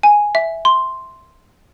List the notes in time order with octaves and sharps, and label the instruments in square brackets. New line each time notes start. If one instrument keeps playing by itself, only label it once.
[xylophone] G#5
E5
C6